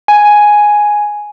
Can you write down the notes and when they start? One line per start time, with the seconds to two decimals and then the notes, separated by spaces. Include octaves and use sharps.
0.08 G#5